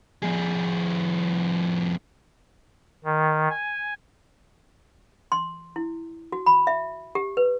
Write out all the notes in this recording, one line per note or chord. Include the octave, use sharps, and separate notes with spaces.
F2 G#4
D#3
G#5
C6
E4
F#4
B5
E5
G4
B4